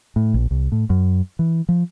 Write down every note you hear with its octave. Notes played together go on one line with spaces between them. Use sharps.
A2
A#1
C2
A2
F#2
E3
F3